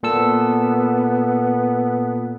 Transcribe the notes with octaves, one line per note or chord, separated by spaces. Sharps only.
A#2 B3 A4 E6